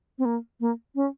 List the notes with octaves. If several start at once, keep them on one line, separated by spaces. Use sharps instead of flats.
C4
A#3
A#3
C#4